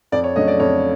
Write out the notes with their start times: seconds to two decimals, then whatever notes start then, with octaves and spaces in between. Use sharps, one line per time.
0.12 F2 D5
0.24 C#5
0.36 C#3 F#3 A3 D4 D#5
0.48 D5
0.60 F2 C#5